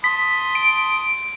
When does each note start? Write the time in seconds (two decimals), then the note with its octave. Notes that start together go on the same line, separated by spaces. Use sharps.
0.04 A5 C6 D#6 B6
0.55 D7